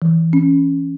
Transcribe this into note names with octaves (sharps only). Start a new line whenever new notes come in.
E3
C#4